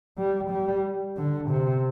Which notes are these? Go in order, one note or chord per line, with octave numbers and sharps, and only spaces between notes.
G3
G3
D3
C3